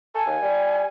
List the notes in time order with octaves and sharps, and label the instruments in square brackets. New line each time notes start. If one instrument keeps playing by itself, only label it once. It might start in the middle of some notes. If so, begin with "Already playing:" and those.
[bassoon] A4 [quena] G#5
[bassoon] D#2
G3